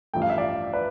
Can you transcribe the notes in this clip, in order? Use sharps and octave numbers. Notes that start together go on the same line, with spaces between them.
A1 G2 F3 A3 G5
F5
E5
D5 F5
B4 D5